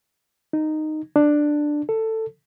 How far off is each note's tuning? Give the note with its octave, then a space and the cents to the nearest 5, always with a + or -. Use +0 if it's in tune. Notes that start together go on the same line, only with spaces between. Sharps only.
D#4 -10
D4 +10
A4 +15